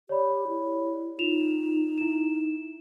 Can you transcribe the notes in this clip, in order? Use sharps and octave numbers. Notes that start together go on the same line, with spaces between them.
G4 C#5 D5 B5
E4
D#4 F4 E7 F7
E4 E7